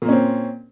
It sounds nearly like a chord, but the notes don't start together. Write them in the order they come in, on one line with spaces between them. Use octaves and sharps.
A#2 A#3 C#4 C4